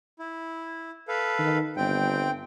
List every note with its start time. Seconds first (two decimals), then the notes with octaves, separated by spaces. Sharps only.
0.19 E4
1.08 A4 B4 F5
1.39 D#3
1.76 G1 C4 G5